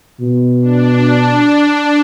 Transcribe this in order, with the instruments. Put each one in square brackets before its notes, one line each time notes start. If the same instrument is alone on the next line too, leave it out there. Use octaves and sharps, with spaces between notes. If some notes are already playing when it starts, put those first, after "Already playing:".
[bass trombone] B2
[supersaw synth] D4
D4